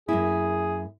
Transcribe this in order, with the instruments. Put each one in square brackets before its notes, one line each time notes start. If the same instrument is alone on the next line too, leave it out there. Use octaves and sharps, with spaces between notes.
[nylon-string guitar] F#2 A#3 E4 [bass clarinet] G#4